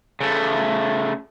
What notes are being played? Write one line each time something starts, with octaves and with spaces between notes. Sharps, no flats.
C#3 A3